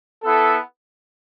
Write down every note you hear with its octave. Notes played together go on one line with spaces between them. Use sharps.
B3 E4 A4